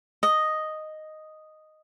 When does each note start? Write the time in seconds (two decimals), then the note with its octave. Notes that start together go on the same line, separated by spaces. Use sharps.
0.23 D#5